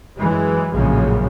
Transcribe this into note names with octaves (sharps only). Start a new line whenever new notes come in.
F#2 E3 G#3
A#1 F#2 A2 C#3 F3 G#3